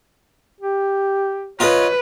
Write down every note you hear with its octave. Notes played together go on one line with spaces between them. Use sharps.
G4
F4 B4 C#5 D#5